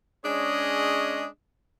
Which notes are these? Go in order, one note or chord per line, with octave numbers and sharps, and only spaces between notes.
G#3 C#4 D4 G#4 C#5 D#5